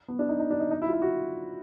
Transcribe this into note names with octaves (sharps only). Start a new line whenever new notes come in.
B3
D4
D#4
D#4
D4
D#4
D#4
E4
F4
E4
F#4